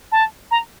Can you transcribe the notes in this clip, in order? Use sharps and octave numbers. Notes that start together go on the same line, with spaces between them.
A5
A#5